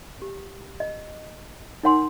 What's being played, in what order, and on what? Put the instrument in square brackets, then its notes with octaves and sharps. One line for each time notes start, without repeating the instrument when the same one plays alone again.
[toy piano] G4
D#5
D#4 A#4 C#5 F#5 G#5 C6